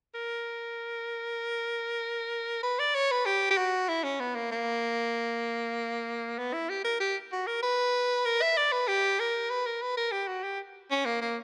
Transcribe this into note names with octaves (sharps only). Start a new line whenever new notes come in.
A#4
B4
D5
C#5
B4
G4
G4
F#4
E4
C#4
B3
A#3
A#3
B3
E4
G4
A#4
G4
F#4
A#4
B4
A#4
E5
D5
B4
G4
A#4
B4
A#4
B4
A#4
G4
F#4
G4
C#4
A#3
A#3